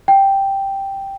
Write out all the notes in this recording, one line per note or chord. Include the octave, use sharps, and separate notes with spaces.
G5